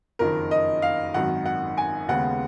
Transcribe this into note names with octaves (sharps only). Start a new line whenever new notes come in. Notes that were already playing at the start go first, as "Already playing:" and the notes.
F#1 F2 D#3 A#4
D#5
F5
G#1 F#2 D#3 F#5
F#5
G#5
D#2 C#3 G#3 B3 F#5